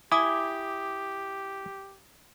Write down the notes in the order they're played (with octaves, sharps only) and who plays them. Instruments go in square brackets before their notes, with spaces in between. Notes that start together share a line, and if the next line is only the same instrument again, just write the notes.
[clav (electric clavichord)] E4 G#5 [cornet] G4 [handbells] D6 D#6